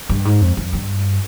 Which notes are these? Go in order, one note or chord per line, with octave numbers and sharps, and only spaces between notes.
G2
G#2
F2
F2
G2